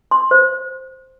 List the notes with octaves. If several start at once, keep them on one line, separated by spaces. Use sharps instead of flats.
C6
C5